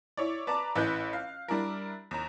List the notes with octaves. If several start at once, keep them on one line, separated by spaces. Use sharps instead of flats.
E4 C#5 D5
B4 D5 A5 A#5 D6
A1 E3 B4 D#5 F#6 G6
F5
G3 D4 E4 A#4
D#2 A#5